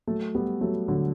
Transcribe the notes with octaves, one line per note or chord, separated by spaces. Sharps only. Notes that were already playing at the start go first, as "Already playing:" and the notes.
F#3 A3
G3 B3
F#3 A3
D3 F#3